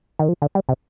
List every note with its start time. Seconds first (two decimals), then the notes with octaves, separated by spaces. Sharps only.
0.19 D#3
0.29 F3
0.42 D3
0.55 G3
0.69 C3